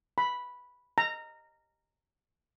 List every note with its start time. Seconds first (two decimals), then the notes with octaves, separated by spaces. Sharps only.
0.18 B5
0.98 A#5